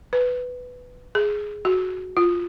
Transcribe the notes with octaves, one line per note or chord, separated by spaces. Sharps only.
B4
G#4
F#4
F4